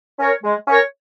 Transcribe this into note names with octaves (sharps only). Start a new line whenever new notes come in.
C#4 A#4 C#5
G#3
C#4 A#4 C#5